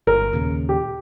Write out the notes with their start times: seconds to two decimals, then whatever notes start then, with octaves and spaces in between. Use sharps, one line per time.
0.07 G1 A#4
0.33 D#2 A#2 C#3
0.69 G4